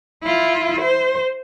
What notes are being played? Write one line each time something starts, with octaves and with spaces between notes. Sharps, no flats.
E4 F4
C5